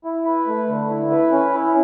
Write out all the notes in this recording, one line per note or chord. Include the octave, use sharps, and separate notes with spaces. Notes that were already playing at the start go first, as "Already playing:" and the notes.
E4
B4
A3
D3
E4
B4
C#4
E4